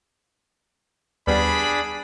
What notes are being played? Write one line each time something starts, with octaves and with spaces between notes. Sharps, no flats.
D#2 G3 B3 D4 G#4 B5